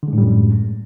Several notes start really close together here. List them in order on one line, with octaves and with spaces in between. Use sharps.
D3 G#3 A2 G3 F#2